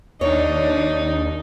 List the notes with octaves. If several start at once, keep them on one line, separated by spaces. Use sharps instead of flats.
D#2 D4 D#4 C#5